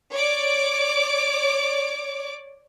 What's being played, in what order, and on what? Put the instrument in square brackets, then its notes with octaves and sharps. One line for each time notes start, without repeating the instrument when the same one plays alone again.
[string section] C#5 D5 D6